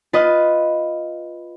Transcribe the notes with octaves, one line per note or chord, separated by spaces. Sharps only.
F4 B4 D#5